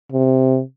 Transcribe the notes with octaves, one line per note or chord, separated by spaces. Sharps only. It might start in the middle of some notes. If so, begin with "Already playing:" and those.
C3